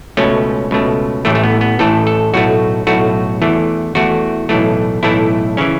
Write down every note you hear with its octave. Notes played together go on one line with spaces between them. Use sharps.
C#2 B2 A3 C#4
C#2 B2 A3
A1 A2 E3 A3
A3
B3
B3
A1 A2 E3 A3 A4
A4
B1 A2 A3 F#4
B1 A2 A3 F#4
E2 E3 A3
E2 E3 A3 F#4
B1 A2 E3 A3
B1 A2 E3 A3 E4
C#3 E3 C#4